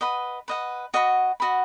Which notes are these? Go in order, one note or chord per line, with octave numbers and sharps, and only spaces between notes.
B4 D#5 F#5
B4 D#5 F#5
F#4 D#5 F#5 B5
F#4 D#5 F#5 B5